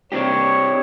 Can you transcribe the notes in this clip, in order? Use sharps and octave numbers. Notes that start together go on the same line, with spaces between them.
C4 D4 G4 C#5